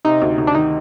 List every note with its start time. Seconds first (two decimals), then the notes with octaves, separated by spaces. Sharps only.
0.05 C3 D#4
0.22 D2
0.38 D2
0.47 D4
0.54 D#3 D#4